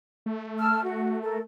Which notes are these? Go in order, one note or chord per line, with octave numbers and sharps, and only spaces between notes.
A3
A5 E6 F6
F#4
A4 A#4